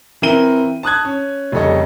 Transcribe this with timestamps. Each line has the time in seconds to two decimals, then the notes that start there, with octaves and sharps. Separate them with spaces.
0.22 E3 C4 E4 A#4 D#7 G7
0.83 A5 D#6 F#6 G#6
1.05 C#4
1.52 F1 C#3 G3 A4 C#5 D#5